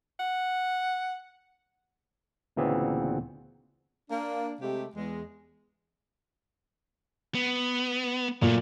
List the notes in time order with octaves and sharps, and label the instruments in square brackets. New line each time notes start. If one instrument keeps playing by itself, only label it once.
[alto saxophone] F#5
[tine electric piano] D2 A#2 C#3 E3 B3 C4
[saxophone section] A#3 D4
C3 G#3 A3 G4
E2 G#3
[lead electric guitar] B3
[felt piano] A#2 [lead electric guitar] F#3 A3